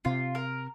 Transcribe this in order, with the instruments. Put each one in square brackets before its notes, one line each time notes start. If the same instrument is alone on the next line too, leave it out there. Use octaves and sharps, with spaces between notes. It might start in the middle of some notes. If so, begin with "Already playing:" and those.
[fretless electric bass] C3 [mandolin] F4
[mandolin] A#4